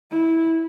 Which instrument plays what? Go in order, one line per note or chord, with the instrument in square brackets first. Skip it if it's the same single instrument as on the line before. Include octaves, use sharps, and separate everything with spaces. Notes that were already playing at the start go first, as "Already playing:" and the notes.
[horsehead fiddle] E4